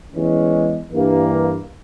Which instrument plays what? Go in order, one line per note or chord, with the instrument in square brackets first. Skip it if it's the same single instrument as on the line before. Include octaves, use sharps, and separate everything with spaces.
[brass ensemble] E2 E3 G#3 C#4
G2 E3 A#3